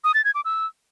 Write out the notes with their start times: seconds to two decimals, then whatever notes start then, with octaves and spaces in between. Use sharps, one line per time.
0.04 D#6
0.14 A6
0.25 G#6
0.35 D6
0.45 E6